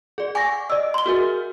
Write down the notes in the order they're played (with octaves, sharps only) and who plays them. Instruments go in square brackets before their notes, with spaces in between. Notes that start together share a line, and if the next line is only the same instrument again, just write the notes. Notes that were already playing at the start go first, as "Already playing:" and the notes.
[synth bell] G#4 D5
[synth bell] F#5 C#6 D6 [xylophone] G#5 A#6
[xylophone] D5 E6 [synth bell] D#5
[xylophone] C6 G7
[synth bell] F#4 G#4 A#4